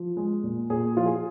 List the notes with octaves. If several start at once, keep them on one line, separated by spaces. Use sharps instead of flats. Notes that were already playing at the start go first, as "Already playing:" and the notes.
Already playing: F3
G#3
A#2
A#2 G#4
F3 F4
G#4